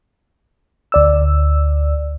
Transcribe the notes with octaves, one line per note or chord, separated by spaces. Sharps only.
D2 D5 E6